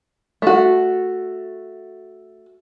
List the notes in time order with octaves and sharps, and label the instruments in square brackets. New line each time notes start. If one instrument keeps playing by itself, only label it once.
[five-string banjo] A3 F#4